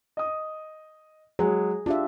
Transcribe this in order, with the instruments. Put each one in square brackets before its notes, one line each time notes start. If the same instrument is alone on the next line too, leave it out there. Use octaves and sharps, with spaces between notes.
[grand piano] D#5 D#6
[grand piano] F#3 G#3 [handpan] G#4
[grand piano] D4 [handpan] F4 G4 E5